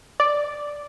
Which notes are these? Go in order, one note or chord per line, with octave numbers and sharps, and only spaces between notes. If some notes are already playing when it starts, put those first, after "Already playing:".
D5